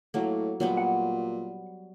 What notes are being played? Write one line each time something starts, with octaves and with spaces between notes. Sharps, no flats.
A2 F#3 A#3
A#2 F#3 G3 B3
F#5